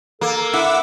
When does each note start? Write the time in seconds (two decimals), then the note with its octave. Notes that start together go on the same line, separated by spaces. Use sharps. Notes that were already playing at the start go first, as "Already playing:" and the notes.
0.21 A#3 A4
0.53 E4 F#5 D6 E6